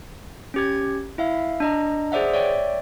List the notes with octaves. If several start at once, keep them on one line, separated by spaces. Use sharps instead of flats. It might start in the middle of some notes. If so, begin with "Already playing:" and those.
C#4 G4 G#6
E4 E5 F5
D4 D#5 A#5
G#4 C5 D5 E5 F#5
C#5 D5 E5 G5